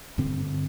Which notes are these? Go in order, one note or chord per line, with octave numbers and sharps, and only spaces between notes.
G2 D3 C4